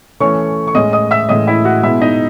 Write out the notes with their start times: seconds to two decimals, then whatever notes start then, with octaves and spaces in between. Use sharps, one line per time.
0.20 E3 A3 C#4 C#5 C#6
0.67 C#6
0.75 A2 G#3 C#4 D#5 D#6
0.93 D#5 D#6
1.11 E5 E6
1.29 A2 E3 G#3 C#4 D#5 D#6
1.47 E4 E5
1.65 F#4 F#5
1.83 B2 G#3 B3 E4 E5
2.02 D#4 D#5